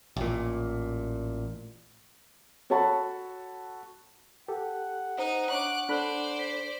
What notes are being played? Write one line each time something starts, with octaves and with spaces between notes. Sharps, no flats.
A1 A#2
F#4 A4 C#5 F#5 A5 B5
G4 A4 F#5
D#4 C5 D#5
D4 C#5 C#6 D6 F#6
D4 A4 C5 D5 B5 F#6
B6